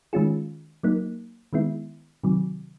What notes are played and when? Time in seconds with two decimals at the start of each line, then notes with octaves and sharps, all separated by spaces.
0.13 D#3 G#3 C#4 F4 G#4
0.83 F#3 A#3 D#4
1.53 D#3 G#3 B3 E4
2.24 C3 D#3 F#3